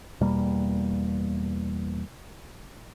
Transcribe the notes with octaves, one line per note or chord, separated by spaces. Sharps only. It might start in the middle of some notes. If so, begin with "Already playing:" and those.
E2 B2 G3 A#3